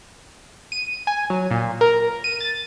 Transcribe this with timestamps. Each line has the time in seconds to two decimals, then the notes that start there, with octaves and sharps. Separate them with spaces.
0.72 D#7
1.07 G#5
1.30 F#3
1.51 A#2
1.81 A#4
2.24 D#7
2.40 A6